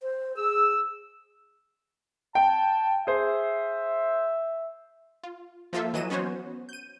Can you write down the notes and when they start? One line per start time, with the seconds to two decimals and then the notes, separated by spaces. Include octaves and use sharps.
0.02 C5
0.37 G#4 E6
2.35 G5 A5
3.07 G#4 C5 E5
5.23 F4
5.73 F3 A#3 F4 A4 E5
5.94 E3 F#3 D#5 D#7 E7
6.10 B3 C#4 F#4 C5 C#5
6.69 G6 D#7